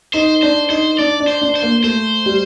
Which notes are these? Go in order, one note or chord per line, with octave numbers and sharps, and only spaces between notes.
D#4 C5
D4 C5
D#4 C5
D4 D5
D4
C5
D4
C5
A#3
A3 C5
G3